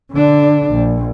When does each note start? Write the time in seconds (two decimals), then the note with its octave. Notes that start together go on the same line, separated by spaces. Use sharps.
0.12 D3 D4
0.72 A#1